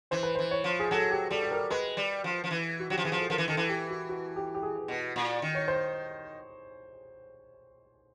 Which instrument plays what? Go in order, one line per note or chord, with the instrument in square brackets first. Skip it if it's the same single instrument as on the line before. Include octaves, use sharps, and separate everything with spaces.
[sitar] E3 [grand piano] C5
[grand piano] B4
C5
[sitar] E3
[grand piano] C#5
[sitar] F3
[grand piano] G#4
[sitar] F#3 [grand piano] A4
[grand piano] G4
[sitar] G3 [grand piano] A4
[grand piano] A4
A#4
[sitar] G#3 [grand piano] B4
[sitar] G3
F3
F3
E3
[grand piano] F#4
[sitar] F#3 [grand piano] G4
[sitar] F3
[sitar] E3 [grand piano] G#4
[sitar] F3
[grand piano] A4
[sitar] F3 [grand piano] A#4
[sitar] E3
[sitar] D#3 [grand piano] A4
[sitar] E3
[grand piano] G4
F#4
F#4
G4
G4
G#4
[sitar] B2
A#2
D#3
[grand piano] C#5
C5